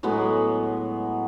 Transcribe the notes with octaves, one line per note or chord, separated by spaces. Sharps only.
A2 F#3 G#3 B3